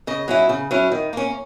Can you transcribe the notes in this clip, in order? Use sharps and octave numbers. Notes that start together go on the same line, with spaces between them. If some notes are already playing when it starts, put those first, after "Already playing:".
C#3 D#5
F#3 C#4 E4
C#3
F#3 C#4 E4
D#3
A#3 C#4